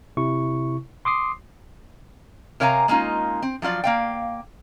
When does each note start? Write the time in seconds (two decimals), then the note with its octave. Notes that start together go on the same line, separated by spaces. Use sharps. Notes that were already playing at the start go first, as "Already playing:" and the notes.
0.17 C3 E4 C#6
1.05 C6 D6 D#6 C7
2.60 C3 A#4 C#5 F5 G#5 A#5
2.88 G#3 A#3 C#4 D#4 F4
3.42 C4
3.62 F3 F#3 F4 D5
3.84 A#3 F5 G5